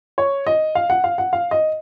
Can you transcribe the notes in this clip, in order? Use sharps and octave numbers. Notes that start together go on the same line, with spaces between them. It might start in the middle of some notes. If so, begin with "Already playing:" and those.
C#5
D#5
F5
F#5
F5
F#5
F5
D#5